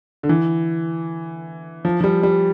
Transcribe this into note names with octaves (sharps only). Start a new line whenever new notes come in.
D3
E3
F3
F3
G3
G3